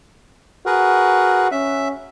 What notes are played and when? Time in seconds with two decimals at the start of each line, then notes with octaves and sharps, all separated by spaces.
0.66 F#4 G#4 A#4 B4
1.52 C#4 E5